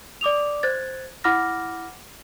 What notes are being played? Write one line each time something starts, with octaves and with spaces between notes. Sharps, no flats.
D5 D6 D#6 F7
C5 F#6 G#6 A6
E4 F#5 B5 D6 F6 A#6